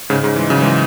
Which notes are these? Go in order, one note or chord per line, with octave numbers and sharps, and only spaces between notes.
G#2 C#3
G#2 C#3
E3 G#3
C#3 F#3
E3 G#3